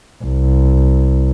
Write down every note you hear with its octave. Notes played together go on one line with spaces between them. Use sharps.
C2